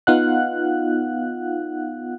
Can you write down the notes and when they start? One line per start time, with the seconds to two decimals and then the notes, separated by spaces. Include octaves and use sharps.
0.07 B3 D#4 F4 F5 F#5 F#6